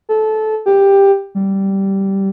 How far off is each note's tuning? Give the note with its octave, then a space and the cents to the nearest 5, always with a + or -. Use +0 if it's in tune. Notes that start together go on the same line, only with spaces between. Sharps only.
A4 -20
G4 +10
G3 -10